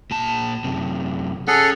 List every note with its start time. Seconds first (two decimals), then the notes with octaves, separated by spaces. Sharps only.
0.11 A#2 A5
0.64 F#2 C3
1.48 C#4 G#4 A4 F#5